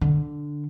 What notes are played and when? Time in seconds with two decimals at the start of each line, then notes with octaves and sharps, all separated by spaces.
0.01 D3